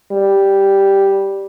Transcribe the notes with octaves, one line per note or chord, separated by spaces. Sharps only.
G3